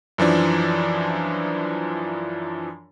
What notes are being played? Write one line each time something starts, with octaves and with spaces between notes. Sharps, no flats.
F#2 E3 F3 D4